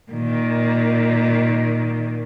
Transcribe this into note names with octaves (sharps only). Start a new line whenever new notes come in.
A#2 D#3